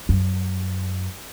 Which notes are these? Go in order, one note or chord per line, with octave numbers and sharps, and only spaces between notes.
F#2